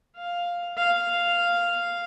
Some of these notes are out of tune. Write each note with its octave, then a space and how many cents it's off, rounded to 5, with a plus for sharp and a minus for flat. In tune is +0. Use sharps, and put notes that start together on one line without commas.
F5 +5
F5 -5